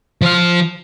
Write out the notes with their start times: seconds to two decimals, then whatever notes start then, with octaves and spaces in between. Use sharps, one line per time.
0.22 F3 F5